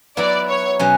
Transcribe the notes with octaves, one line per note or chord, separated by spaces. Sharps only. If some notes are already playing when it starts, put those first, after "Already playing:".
F#3 B3 E4 D5
C#5
B2 F#3 C#4